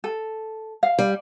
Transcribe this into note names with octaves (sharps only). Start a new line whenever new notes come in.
A4
F5
G3